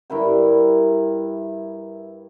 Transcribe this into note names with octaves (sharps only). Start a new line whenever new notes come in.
G2 E4 A#4 G5